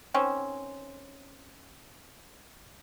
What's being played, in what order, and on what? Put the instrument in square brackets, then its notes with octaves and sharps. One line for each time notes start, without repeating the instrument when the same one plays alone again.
[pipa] D#3 C4 C#4